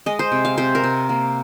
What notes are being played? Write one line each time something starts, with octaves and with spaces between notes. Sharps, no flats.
G#3 D#5
C5
C3
F5
C3 C5
A#4
C3
A#3